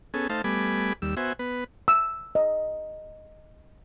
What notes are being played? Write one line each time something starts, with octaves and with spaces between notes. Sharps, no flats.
B3 C#4 G#4 A4
A3 D#4 C5 F5 A5
G3 A3 B3 G#5 B5 D6
D#2 G3 E6
B3 F#4 C5 E5 G#5
B3 B4
E6
D#5